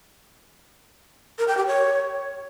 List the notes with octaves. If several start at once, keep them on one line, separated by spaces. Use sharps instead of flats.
A#4
G5
G4
C#5